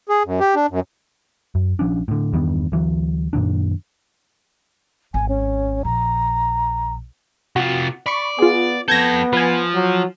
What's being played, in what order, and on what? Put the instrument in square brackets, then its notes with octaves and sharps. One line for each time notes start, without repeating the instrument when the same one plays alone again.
[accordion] G#4
F#2
G4
D4
F#2
[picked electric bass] F#2
A#1 F3 C#4 D4
A2 D3
E2 G2 D#3 B3
D2 E3 F#3
F#2 A#2 D#3 D4
[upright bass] G#1 [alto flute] G#5
[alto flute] C#4
[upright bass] A#1 [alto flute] A#5
[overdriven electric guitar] C3 F4 [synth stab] F#4
[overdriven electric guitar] D5 [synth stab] B5 C#6
[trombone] B3 [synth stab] F4 G#4
[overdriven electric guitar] F2 A4 [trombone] B3 [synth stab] G6 G#6 A#6
[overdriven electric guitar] F3 [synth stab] B4 G#5
[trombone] F#3